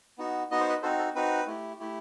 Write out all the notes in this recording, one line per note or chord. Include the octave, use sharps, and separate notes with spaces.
B3 D#4 F#4
B3 D#4 F#4 D#5
C5
B4 D#5
C4 D#4 F#4 A4 C5
A4
C4 D#4 F#4 B4
A3 E4 G4
A3 E4 G4